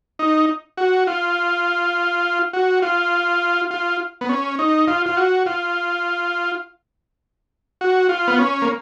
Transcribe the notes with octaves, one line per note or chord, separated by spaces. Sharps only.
D#4
F#4
F4
F#4
F4
F4
B3
C#4
D#4
F4
F4
F#4
F4
F#4
F4
B3
C#4
A#3